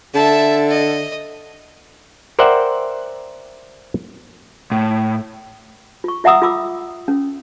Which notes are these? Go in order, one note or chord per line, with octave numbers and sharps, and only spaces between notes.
D3 E5 A5
D#5
A#4 C5 D5 E5 F#5 G5
A2
F4 C#6
F4 E5 F#5 A#5 D#6 E6
F4 B5 D6 E6
C#4